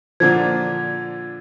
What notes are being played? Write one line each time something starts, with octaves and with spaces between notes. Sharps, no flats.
A#2 D3 F3 G#6